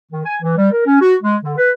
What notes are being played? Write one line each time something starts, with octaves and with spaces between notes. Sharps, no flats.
D#3
G#5
E3
G3
A#4
C#4
F#4
G#3
D3
B4